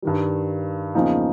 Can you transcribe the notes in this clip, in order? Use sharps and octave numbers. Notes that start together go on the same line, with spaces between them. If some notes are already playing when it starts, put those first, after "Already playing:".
G2 D#3 G3
E2 C#3 F3 A#3 D#4